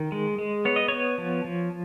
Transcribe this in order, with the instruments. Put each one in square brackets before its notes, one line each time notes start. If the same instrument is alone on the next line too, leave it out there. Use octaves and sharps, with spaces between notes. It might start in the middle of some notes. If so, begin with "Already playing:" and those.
Already playing: [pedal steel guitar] D#3
G#3
G#3
B3 C#5
D#5
B3 C#5
F3
F3